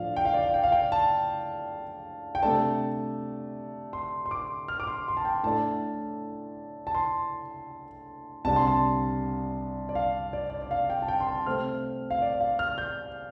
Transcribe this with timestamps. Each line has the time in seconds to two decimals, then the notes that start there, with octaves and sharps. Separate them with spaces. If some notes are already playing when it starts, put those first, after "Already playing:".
Already playing: A2 F3 D4 D5 F5
0.17 G5
0.25 F5
0.34 D5
0.43 F5
0.54 G5
0.64 F5
0.72 G5
0.92 A5
2.35 G5
2.43 C3 A3 D4 A5
3.93 C6
4.26 C6
4.31 D6
4.68 F6
4.80 D6
4.87 C6
5.08 C6
5.17 A5
5.25 G5
5.43 A2 A3 D4 A5
6.87 A5
6.95 C6
8.44 C2 C3 G3 D4 A5
8.56 C6
8.67 A5
9.89 D5
9.95 F5
10.33 D5
10.50 D5
10.62 D5
10.71 F5
10.90 G5
11.02 A5
11.08 G5
11.20 C6
11.27 A5
11.46 C3 A3 C4 F6
12.10 F5
12.22 D5
12.40 F5
12.59 F6
12.78 G6